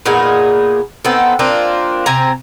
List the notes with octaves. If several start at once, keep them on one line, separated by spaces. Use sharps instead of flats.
A#2 B3 D#4 G#4
B3 C4 D#4 A4
A#3 C4 D4 F4
C3 C4 G#5 A#5